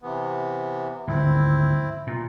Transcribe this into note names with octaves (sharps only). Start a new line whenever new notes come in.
C3 E3 B3
G#1 D2 D3 C4 E4
A#2